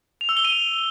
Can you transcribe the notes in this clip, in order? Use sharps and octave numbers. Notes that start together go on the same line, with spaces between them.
F7
E6
G7
D#7
F7